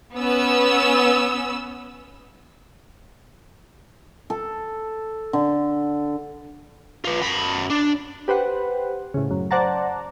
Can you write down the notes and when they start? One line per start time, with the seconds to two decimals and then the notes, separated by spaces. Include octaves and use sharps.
0.14 B3 C#4 E6
4.30 A4
5.33 D3
7.05 F4 B4
7.22 F#2 B5
7.70 D4
8.28 G4 B4 C5 F#5
9.14 A2 C#3
9.31 F#2
9.51 C5 D5 F#5 A5 A#5